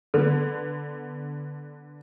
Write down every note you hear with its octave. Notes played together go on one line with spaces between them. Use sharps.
D3 B3